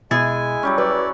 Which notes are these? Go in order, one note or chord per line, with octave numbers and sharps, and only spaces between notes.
B2 G#3 E4 G#4 G#5 A6
F#3 G3 C#4
F#3 B4 D5